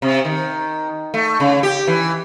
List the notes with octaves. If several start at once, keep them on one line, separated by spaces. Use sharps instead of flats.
C3
D#3
A3
C#3
G4
E3